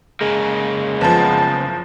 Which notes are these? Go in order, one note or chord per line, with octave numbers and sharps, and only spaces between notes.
C#3 G#3 A#3
F#1 F3 B3 A5